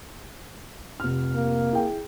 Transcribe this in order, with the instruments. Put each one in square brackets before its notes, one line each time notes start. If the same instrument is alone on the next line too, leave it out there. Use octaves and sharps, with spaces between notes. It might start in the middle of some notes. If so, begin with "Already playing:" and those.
[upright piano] F1 F6
[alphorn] A#3
[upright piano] E4 G#4 G5